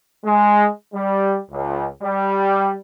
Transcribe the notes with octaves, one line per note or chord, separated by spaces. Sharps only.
G#3
G3
C#2
G3